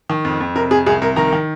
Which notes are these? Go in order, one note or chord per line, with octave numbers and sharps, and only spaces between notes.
D#3
F2
F2
C3 A#4
F2 G#4
C2 G#4
C2 A#4
D#3 A#4 A#5
D#3